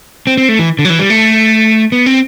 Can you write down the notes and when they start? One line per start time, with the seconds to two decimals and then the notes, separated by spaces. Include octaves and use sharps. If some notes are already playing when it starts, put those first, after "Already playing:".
0.27 C4
0.37 C4
0.49 A3
0.59 E3
0.79 D3
0.85 F#3
0.90 E3
0.99 G3
1.10 A3
1.92 B3
2.06 C4